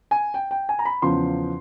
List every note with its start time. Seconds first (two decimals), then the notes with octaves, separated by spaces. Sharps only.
0.11 G#5
0.34 G5
0.51 G5
0.69 G#5
0.79 A#5
0.85 B5
1.02 E2 C#3 F3 C6